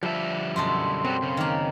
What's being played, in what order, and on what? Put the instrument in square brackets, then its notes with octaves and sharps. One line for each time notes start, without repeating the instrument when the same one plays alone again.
[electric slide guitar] D3 G3 E5 [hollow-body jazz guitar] F3
[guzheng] F#2 B2 A4 [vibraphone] C6
[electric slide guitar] F#3 G3 [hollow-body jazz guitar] C4
[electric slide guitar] C#3
[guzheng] D#3 A#3